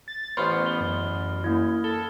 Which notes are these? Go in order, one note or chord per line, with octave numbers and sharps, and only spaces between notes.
A6
A1 B3 C#4 C5 B5 F6 A6
B5 G7
F#2
A#3 E4 G#6
A4 G7